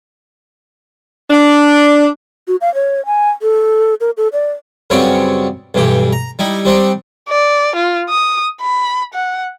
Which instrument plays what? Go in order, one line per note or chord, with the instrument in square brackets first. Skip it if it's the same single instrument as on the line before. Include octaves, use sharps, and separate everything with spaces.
[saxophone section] D4
[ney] F#4
F5
C#5
G#5
A4
A#4
A4
D5
[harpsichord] F#2 C#3 G3 B3 C4 C#5
B1 G2 E3 G4
A#5
G3 D#4 E4
G3 C4 D4 D#4
[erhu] D5
F4
D#6
B5
F#5